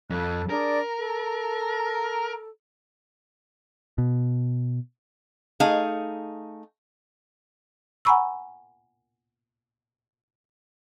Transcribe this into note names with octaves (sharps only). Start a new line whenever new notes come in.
F2 A4 F#6
D4 G#4 A#4 D5
A4
B2
A3 D#4 G#4 F5
F#5 G#5 A#5 B5 C#6 E6